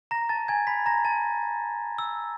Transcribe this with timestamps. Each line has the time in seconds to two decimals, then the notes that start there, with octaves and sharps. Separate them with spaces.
0.11 A#5 A#6
0.29 A5 A6
0.48 G#5 G#6
0.67 B5 B6
0.86 A#5 A#6
1.05 A5 A6
1.99 E6